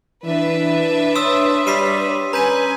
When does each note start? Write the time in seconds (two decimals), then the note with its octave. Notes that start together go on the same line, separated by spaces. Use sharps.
0.24 E3 D4 B4 E5
1.15 C#5 C6 D#6 E6
1.67 G3 B6 C7 D#7
2.33 C#4 B4 G#5 A#5 G6 D#7